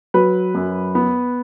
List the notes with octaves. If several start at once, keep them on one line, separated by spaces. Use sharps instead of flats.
F#3 B4
F#2
B3